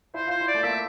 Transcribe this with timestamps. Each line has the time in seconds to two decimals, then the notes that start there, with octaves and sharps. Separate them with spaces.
0.14 E4 C5
0.27 F4 C5
0.41 E4
0.48 D5
0.55 A3
0.63 A#3 E5